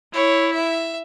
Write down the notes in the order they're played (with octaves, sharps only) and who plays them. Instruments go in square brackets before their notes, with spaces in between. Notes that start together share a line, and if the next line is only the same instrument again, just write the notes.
[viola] E4 [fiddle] C#5
[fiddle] E5